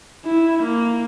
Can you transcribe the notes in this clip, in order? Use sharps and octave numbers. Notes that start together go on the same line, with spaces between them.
E4
A#3